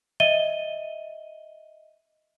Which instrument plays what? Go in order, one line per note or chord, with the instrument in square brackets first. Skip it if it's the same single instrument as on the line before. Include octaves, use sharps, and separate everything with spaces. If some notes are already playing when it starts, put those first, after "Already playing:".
[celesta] D#5 E5 D#7 G7